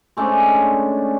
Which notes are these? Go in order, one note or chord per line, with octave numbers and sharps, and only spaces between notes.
G#3 A3 C#4 D4